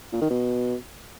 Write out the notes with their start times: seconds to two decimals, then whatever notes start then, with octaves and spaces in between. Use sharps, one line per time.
0.13 A#2
0.21 D#3
0.30 B2